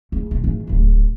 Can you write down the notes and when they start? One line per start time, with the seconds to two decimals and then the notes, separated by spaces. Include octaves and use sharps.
0.12 C#2
0.31 B2
0.44 G#1 D#3
0.67 D1 G#1